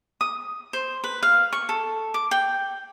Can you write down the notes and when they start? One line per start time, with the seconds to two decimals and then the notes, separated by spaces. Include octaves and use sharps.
0.21 D#6
0.73 C5
1.04 B4
1.23 F5
1.53 C#6
1.69 A4
2.14 D6
2.31 G5